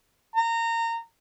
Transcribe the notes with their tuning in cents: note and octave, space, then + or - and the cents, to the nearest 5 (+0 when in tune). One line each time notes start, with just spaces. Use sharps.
A#5 -25